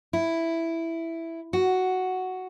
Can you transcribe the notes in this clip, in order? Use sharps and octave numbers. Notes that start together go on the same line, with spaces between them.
E4
F#4